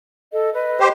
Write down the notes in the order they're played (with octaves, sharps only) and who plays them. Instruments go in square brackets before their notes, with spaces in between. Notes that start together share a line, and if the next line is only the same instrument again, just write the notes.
[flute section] A4 D#5
B4 D#5
[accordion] G4 C5